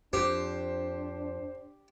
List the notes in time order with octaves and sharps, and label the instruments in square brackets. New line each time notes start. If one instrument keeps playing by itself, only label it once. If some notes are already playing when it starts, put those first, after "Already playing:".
[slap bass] F2 [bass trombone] D4 [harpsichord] G4 [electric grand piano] C5